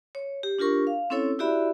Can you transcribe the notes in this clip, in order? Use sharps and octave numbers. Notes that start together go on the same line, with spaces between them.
C#5
G4
D4 F4 G4 A#4 C#6
F5
C4 C#4 E4 A4 C#5 E6
E4 F#4 G4 D5 E5 B5